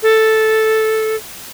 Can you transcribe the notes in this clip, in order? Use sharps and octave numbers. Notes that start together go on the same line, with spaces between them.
A4